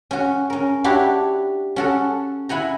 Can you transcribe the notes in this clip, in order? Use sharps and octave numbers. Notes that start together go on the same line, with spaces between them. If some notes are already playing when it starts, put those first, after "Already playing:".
C#4 F#4
C#4 A#4
D4 E4 F#4 G4 C#5
C#4 F#4 A4
E4 F#5 G#5 A#5